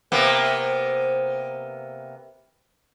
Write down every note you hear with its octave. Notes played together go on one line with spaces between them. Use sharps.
C3 A#3 B3